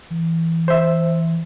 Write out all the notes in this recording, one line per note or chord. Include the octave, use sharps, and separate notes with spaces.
E3
C5 E5